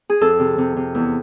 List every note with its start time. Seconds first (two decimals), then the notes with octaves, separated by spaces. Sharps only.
0.10 G#4
0.21 F2 A4
0.40 C3
0.58 C3
0.76 C3
0.95 E2